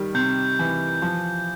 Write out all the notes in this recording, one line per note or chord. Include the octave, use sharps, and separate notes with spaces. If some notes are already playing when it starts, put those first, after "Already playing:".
Already playing: D#3 G3
C3 G6
E3
F3